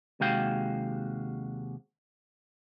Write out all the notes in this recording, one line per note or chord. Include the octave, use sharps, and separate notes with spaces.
D#2 C3 G#3 F#4 F5 G5